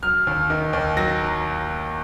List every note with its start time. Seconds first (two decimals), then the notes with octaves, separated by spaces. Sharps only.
0.03 F#3 F6
0.27 D#2
0.50 D#3
0.73 D#2
0.97 F#3 A#6